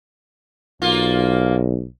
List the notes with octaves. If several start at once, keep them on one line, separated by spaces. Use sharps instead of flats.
B1 A#3 F4